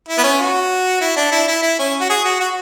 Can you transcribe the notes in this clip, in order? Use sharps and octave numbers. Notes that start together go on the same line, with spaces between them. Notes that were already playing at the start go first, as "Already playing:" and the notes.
E4
B3
C#4
F#4
E4
D4
E4
E4
E4
C#4
F#4
G#4
F#4
F#4